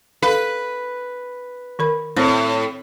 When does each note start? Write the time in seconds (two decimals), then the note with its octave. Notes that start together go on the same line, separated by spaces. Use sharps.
0.22 A4 B4 F5
1.79 D#3 A#4 B5
2.16 A2 C4 C5